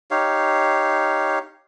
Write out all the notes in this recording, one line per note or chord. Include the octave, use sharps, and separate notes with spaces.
D#4 G4 C#5 F5